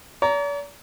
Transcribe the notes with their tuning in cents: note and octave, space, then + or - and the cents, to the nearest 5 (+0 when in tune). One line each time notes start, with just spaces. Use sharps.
D5 -45 A#5 -5